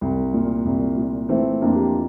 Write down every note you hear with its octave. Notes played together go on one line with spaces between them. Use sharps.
C2
A#2
C2
A#2
E3 A3 C4
F2 A#3 D4
G4
F4